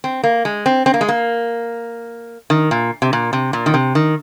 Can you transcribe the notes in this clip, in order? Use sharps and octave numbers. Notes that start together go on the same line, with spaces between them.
C4
A#3
G#3
C4
C4
A#3
G#3
A#3
D#3
A#2
C3
A#2
C3
A#2
D#3
C3
D#3